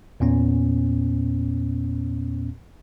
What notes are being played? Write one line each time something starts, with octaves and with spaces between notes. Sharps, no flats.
E2 A#2 B3 C#4